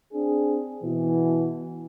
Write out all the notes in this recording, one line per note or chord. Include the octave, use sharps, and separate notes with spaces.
C4 D4 G#4
B2 E3